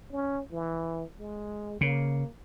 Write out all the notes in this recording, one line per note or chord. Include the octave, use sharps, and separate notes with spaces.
C#4
E3
G#3
C#3 A#3